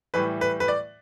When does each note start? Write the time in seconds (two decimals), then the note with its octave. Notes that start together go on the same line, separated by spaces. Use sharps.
0.14 A2 E3 G3 B4
0.41 B4
0.60 B4
0.68 D5